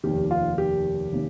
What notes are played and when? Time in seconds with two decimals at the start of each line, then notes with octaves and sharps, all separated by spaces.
0.04 F1 D#2 D#3 G4
0.31 F4
0.58 G4
1.12 C3 D#3 A#3 C#4